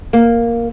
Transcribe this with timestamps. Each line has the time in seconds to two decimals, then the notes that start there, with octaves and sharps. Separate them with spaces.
0.13 A#3